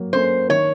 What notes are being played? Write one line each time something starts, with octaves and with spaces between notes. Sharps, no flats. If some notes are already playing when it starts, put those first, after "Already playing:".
Already playing: F#3 A#3
A#3 C#4 A4 C5
D#3 C#5